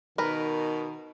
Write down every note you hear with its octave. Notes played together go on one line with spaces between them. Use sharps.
B2 D#3 A#4 B4